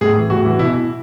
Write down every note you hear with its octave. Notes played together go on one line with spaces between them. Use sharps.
A2 G#4
E3
A2 F#4
E3
B2 E4